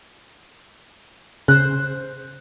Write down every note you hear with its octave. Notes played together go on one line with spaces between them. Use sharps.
C#3 C5 F#6